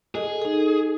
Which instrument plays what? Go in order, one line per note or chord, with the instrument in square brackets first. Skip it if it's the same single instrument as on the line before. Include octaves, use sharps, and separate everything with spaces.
[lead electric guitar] G#4 [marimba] A4 D#5
[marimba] D#4 A4